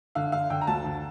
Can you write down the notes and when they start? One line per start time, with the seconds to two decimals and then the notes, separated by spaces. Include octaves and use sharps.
0.15 D3 F5
0.32 D3 F5
0.50 D3 G5
0.61 A#5
0.67 D2 A5
0.85 D3